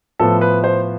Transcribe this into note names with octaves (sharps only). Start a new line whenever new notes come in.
A2 F3 B3 A4
B4
C5